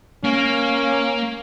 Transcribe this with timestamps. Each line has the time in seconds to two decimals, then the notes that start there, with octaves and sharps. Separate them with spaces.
0.24 A#3 C#4